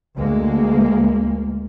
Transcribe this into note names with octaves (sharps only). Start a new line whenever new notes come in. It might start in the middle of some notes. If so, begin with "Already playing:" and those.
D2 G#3 A#3